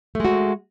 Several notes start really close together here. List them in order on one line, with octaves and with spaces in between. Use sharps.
A3 G#3 F#4